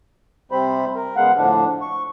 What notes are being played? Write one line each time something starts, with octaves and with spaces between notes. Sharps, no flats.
C3 G3 C4 C5 B5
A#4
C#3 G#3 B3 F5 F#5
A2 D3 F3 D4
C#6